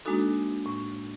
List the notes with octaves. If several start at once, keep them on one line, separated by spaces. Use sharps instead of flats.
G#3 A#3 D4 D#4 F#4 A4
A2